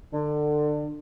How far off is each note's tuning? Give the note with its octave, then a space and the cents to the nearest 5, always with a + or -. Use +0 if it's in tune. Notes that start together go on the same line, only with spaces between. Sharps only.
D3 +25